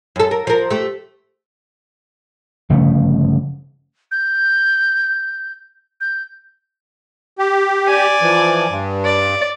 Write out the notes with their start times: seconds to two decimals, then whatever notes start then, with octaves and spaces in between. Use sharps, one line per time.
0.16 F#2 A4
0.31 A#4
0.47 F3 A#4
0.71 A3 G4
2.70 G1 C#3 F3 A3
4.11 G6
6.01 G6
7.39 G4
7.87 D5 G#5
8.22 E3 F3
8.69 G2
9.04 D5